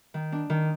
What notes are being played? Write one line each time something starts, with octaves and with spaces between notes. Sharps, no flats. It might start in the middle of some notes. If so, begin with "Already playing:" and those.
D#3
D4
D#3